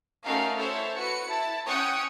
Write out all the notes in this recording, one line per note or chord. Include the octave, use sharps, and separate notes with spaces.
A3 C#4 D#4 F#4 A#4 F5
E4 A4 C5 C#5 E5
F#4 B4 C#7
E4 A5
C#4 C#5 F#5 G5 C#6 D#6